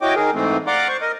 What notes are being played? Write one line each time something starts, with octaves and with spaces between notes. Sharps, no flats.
E4 F#4 C#5 D#5 G5 D6
D#3 G#4 A#4
G#2 E3 A3 C4
D5 F5 F#5 A#5 C6 D6
C5 C#6
A#4 D#5